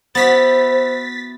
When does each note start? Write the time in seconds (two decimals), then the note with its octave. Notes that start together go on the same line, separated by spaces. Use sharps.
0.15 B3 E4 F#4 C5 A6 B6